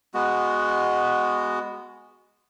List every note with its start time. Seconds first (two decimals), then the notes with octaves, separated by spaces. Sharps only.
0.14 G#3 B3 F#4